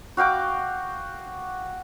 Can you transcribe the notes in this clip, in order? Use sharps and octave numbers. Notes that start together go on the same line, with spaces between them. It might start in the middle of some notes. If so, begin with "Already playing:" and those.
F#4 F5 G5 D6